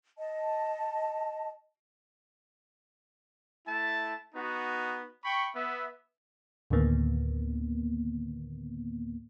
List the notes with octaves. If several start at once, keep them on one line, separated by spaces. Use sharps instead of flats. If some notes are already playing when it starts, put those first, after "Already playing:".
D#5 A5
A3 E4 A5
B3 D#4 F#4
G5 B5 C#6
B3 E5
D2 A2 D3 D#3 A#3 B3